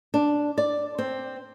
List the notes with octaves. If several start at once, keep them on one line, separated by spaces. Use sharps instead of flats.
D4
D5
C4